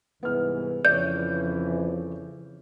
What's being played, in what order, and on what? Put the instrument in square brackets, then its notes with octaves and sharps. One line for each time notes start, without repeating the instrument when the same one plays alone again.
[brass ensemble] C2 G#2 E3 [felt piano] B3 F6
[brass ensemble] F2 C#3 E3 [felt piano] C#5 D5 [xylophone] G6